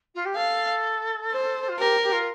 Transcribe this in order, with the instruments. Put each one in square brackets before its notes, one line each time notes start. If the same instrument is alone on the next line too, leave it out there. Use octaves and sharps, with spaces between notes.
[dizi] F4
G4
[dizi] A4 [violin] F5
[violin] C5
[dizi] F4
[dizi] G4 [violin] A#4
[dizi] G4
F4